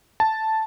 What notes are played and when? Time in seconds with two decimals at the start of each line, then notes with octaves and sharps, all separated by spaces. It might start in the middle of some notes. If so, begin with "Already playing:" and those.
0.20 A5